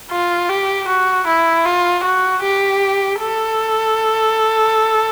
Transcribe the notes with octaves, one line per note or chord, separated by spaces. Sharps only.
F4
G4
F#4
E4
F4
F#4
G4
A4